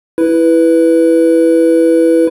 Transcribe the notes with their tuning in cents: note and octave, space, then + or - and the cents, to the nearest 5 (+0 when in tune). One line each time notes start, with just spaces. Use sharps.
E4 +0 B4 +0